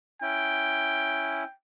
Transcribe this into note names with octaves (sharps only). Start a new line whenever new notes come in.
C#4 E4 G5